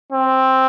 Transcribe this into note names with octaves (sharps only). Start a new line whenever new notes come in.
C4